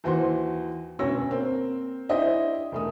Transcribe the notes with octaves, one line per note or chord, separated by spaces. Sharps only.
D#2 E3 F#4 C5 C6
D2 B2 C#4 C#5 E6 A#6
A#3 C4
D4 E4 G4 C5 D#5 E5
E1 A3 D#6